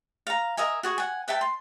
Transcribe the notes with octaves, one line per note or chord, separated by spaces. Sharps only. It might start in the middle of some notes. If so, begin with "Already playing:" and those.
F5 A#5
A#4 D#5 E5 G#5
F#4 G#4 C#6
F#5 G#5
B4 E5 G5 A5
C6